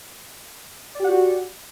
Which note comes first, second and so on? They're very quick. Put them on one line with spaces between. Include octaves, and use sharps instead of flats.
D5 G4 F#5 F#4